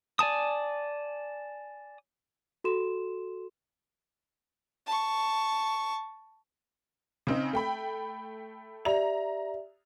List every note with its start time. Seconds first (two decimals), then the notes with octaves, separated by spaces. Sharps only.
0.19 D5 G#5 A5 D#6
2.64 F#4 A4 C6 E7
4.87 A5 C#6
7.27 C#3 C4 D#4
7.53 A3 G5 B5
8.85 G4 D5 E5 A#5 F7